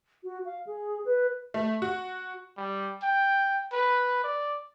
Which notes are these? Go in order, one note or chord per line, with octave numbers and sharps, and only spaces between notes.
F#4
F5
G#4
B4
A3
F#4
G3
G5
B4
D5